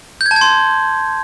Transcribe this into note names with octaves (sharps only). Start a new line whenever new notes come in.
G6
G#6
A5
G#6
C6